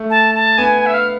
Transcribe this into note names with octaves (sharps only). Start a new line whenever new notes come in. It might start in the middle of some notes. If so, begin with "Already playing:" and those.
Already playing: A3
A5
A5
B3 G#5
G#5
E5
F5